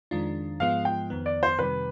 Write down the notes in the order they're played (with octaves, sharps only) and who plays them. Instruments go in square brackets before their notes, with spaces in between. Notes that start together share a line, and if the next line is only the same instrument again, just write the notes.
[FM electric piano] F2 D#3 G#3 D4 F4
[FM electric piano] G#2 F3 G#3 B3 F4 [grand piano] F5
[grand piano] G5
[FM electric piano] F2 D#3 B3
[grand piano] D5
C5
[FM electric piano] F2 C3 D#3 G3 [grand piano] B4